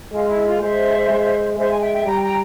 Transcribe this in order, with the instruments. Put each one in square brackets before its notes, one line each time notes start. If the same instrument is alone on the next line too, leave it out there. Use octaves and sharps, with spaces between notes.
[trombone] G#3 [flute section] F4
[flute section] E4
F4
[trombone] G#3 [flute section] C5 E5
[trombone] G#3
[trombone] G#3 [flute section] C5 E5
[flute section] G#5
E5 G5
E5 G5
[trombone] G3 [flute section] G5 A#5
[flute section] G5 A#5